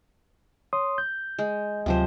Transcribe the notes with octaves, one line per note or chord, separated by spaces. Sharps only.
C#5 C6 D#6
G6
G#3
D2 C3 F3 F#3 C5